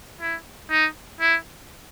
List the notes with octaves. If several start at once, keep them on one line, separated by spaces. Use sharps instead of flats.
E4
D#4
E4